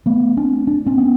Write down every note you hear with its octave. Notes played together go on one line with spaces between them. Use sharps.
A3 B3
C4 D4
D4
C4 D4
B3 C#4